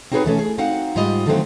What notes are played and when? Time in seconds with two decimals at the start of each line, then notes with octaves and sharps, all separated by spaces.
0.12 C4 D#4 F#4 G#4 B4 C#5
0.24 B2 E3 A3 C#4
0.39 G#4
0.58 C4 D#4 F#4 F5 F#5
0.96 G#2 G3 F4 D#5
1.26 D3 D#3 F3 F#3 A3 C4